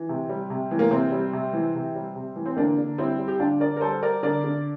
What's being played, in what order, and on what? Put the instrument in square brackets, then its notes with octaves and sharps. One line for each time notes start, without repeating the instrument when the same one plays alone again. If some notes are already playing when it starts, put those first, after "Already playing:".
Already playing: [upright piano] E3
C3
G3
C3
E3
A#3
C3 C4
G3
C3
E3
C3
G3
C3
E3
C4
D3 A#3 D4
D3
G3 C4 E4
G3
G4
D3 D4 F4
D3 A#4 D5
A#4
G3 A4 C5
G3 A#4 D5
D3 A#4 D5
D3